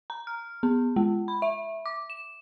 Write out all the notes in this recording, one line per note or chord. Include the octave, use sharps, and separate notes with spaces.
A#5
F6
B3
G#3
B5
E5
D6
E7